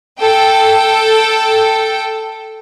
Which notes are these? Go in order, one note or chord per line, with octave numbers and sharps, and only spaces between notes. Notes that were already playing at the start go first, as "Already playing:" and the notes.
A4 G5